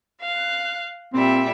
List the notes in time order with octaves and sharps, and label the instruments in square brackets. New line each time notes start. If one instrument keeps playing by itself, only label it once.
[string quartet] F5 F#6
[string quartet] A#2 G3 E5 [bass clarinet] C4